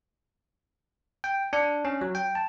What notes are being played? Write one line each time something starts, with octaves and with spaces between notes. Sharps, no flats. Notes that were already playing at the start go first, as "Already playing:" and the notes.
G5
D4
C#4
F#3
G5
A5